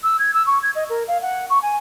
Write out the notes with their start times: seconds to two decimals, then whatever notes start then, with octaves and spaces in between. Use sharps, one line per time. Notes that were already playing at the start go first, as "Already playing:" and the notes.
0.03 E6
0.19 G#6
0.33 E6
0.46 C#6
0.62 G#6
0.74 D#5
0.89 A#4
1.07 F5
1.22 F#5
1.49 C#6
1.62 G#5